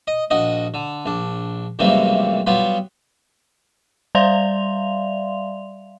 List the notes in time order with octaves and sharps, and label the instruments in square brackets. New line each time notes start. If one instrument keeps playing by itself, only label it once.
[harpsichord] D#5
A#1 F#4 D#5
D3
A#1 D4
C#2 F#2 C3 E3 G3 A#3
F#3 G3 B3 F4
[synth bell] G3 D5 E5 F5 C6 F7